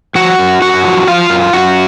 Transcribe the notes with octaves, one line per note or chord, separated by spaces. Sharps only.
F3 F#4 F#5
F#2
F#2 F#4 F#5
F3
F3 F4 F5
F#2
F#2 F#4 F#5